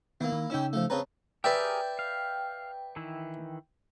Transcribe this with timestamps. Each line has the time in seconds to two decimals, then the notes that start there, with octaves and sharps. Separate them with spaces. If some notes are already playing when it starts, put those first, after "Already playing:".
0.21 D#3 A#3 B3 E4
0.32 D#3
0.50 C#3 C#4 D#4 G5 E6
0.73 F3 A3
0.90 C#3 C4 B4 C#5 A5 A#5
1.44 G4 G#4 A#4 B4 D5 E5 G5
1.99 F5
2.96 D#3 E3 E4